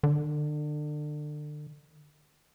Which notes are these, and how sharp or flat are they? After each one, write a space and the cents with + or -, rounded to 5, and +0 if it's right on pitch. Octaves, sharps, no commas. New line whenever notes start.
D3 +30